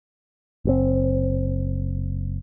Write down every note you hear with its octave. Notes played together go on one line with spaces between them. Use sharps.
F#1 A#2 C4